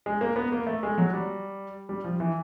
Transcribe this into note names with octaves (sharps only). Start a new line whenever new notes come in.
G#3
A#3
B3
A#3
A3
G#3
F#3
G3
G3
F3
E3